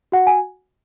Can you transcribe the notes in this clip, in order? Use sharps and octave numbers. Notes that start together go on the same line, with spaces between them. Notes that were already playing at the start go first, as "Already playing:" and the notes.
F#4 F#5
G#5